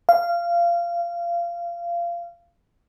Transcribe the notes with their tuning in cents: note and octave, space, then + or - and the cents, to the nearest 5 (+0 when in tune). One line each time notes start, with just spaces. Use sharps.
F5 -20